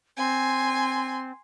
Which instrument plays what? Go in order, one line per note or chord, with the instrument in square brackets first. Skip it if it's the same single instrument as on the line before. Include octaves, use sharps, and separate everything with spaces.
[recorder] C4 [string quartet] G#5 C6